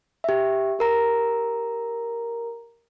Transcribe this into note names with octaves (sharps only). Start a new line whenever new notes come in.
G4 E5
G4 A#4 A#5